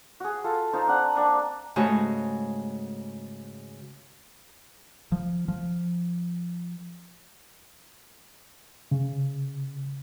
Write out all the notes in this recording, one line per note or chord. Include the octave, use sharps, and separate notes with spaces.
F#4 G#4
F4 A4
D#4 F4 C5 C#5
C4 D4 F#5
A#3 D4 C#6 D#6
G#2 C#3 A3 F#4
F3
F3
C#3